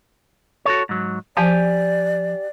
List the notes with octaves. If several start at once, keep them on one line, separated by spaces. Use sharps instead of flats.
F#4 A4 C#5
G#2 F#3
F3 G4 D5 G#5